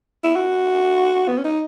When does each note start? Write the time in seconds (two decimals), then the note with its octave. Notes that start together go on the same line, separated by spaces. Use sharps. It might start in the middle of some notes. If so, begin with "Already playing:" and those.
0.24 E4
0.36 F#4
1.28 B3
1.38 C#4
1.44 D#4